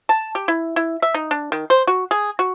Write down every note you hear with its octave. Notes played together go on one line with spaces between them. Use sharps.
A5
G4
E4
E4
E5
D#4
D4
D#3
C5
F#4
G#4
F#4